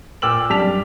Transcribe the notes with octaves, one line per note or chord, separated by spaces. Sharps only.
A#2 G5 D6 E6 F6 F#7
F#2 G3 D4 A5 B6 F7